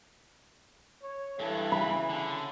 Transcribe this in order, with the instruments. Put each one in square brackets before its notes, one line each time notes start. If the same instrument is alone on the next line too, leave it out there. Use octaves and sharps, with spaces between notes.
[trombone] C#5
[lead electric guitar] G2 [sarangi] E3 [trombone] A4
[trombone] C#3 [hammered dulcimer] B5
[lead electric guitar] D3